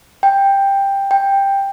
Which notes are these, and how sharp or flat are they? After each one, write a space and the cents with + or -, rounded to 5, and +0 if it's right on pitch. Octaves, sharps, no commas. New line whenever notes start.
G5 +10
G5 +10